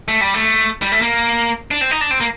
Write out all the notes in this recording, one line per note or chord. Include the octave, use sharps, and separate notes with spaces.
A3
G3
A3
G3
A3
A#3
D4
C4
D#4
D4
C4
A#3